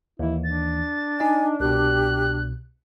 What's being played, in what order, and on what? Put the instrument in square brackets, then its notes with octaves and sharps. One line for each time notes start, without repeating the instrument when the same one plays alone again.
[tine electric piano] D#2 E3 [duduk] E4
[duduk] D4 [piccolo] A6
[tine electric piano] D#4 D#5 [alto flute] G#5
[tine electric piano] C2 B2 [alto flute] G4 [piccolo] F#6